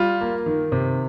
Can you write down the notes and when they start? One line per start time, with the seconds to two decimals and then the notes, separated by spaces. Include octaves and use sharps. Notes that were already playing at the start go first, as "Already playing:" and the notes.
Already playing: G3 F4
0.21 A#3
0.46 D#3
0.72 C3